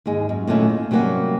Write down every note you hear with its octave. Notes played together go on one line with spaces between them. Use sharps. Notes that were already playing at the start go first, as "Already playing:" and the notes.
D#2 G#2 G#3
F#2
A#2 D#3 F#3 A3 C#4 E4
F4
C3 F#3 G3 A#3 C#4 F#4